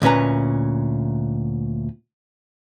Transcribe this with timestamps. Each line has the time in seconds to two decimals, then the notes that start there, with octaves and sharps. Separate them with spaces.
0.02 D2 A#2 C#4 B4 A#5